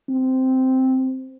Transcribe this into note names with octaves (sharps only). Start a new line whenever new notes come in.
C4